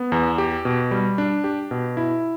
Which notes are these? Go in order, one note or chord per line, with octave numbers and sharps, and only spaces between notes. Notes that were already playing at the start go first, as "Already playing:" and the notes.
Already playing: B3
E2
G4
B2
G3
D4
G4
B2
E4